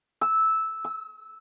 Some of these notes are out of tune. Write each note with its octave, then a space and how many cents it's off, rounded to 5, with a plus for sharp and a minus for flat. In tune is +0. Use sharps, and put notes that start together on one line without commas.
E6 -10
E6 -45